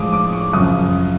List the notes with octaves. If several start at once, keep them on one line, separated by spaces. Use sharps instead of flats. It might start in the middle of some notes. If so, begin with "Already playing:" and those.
Already playing: A2 F3 G#3 D6 D#6
D6
C#6
F#2 C#3 F3 D#6